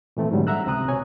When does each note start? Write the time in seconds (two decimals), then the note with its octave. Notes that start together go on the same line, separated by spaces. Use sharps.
0.17 A#2 E3 A3 C4
0.31 G#2 D3 F#3 G3
0.47 E5 F#5 A#5 E6 F#6
0.66 C#2 C3 C4 A#5 D#6 F#6
0.88 B2 C#5 G#5